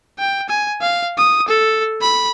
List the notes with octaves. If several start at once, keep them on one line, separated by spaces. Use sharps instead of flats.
G5
G#5
F5
D#6
A4
B5